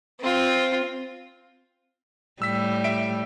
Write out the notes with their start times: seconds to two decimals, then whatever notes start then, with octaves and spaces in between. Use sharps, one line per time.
0.21 C4 F4
2.42 A2 G3 E6 B6
2.84 E5 D7